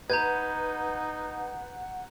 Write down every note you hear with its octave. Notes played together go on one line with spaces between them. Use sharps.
D#4 B4 F#5 A#5 G6 G#6